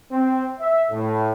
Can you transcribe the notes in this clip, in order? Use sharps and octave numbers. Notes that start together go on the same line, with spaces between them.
C4
E5
A2